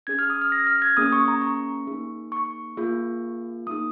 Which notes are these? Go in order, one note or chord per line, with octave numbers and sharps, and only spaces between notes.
C#4 G#4 G#6
F6
D#6
F6
A#6
F6
G#6
A#3 C#4 G#4 D#6
C#6
A#5
C#6
A#3 D#4 G#4
C#6
A#3 F4 G#4
A#3 D#4 G#4 D#6